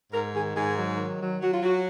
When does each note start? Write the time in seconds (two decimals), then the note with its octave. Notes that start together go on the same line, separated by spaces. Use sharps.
0.12 G#2 A#4
0.33 D#3 G#4
0.55 G#2 G#4
0.77 F#3
0.97 D#3
1.19 F#3
1.40 F#3 F#4
1.51 F4
1.62 F#3 F#4